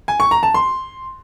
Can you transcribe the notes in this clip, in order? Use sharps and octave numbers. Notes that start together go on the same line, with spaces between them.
G#5
C#6
A#5
A5
C6